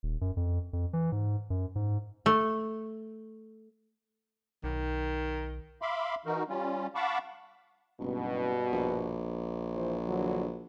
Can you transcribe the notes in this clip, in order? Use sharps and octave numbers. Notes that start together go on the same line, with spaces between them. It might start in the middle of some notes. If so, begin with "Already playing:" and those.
D#1
F#2
F2
F2
E3
G#2
F#2
G#2
A3
B1 D#3
E5 F5 B5 C6 D6
E3 D#4 F#4 A#4
G3 C#4 F4
F5 F#5 A5 B5 C#6 D6
F#1 G2 B2
A#1
E3 F4 C5
D3 E3 F#3